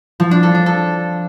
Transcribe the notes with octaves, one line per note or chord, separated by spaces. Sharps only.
F3
D4
A4
D4
A4